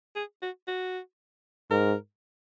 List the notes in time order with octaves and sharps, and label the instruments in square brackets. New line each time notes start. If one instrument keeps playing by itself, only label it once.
[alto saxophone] G#4
F#4
F#4
[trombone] G#2 [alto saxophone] A#4